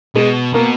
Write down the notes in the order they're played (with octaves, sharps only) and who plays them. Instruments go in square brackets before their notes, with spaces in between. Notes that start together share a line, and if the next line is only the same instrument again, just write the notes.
[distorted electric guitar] B2 [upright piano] G#3
[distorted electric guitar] B2 [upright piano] A#3